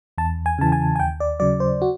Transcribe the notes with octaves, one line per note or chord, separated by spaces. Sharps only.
E2 A5
G#5
C#3 E3 A5
G#5
G#5
D#2 G5
D5
C#3 F#3 D5
C5
F#4